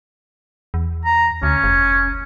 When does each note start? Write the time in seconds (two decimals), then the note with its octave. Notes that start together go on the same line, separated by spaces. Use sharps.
0.74 E2
1.05 A#5
1.43 D2 C#4
1.64 F1